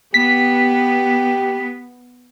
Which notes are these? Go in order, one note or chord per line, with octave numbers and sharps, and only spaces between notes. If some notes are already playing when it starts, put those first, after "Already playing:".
B3 G4 B6